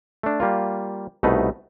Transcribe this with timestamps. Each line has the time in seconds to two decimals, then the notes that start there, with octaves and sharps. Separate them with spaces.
0.23 A3 D4
0.40 G3 A#3 F4
1.23 C2 B2 A3 D#4 B4